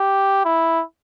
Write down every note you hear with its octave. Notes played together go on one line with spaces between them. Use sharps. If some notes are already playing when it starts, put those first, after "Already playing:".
Already playing: G4
E4